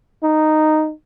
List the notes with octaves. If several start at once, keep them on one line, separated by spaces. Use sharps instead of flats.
D#4